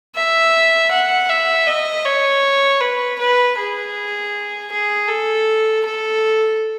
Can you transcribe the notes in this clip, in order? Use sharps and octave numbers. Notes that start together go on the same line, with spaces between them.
E5
F#5
E5
D#5
C#5
B4
B4
G#4
G#4
A4
A4